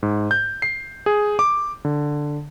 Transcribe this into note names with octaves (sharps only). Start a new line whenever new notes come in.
G#2
G6
C7
G#4
D6
D3